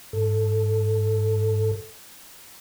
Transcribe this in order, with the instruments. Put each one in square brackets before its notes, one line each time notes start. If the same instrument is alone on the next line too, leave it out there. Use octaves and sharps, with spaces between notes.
[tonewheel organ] G#2 A4